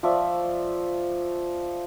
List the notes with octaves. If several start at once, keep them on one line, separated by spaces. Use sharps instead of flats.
F3 D5 E5 C#6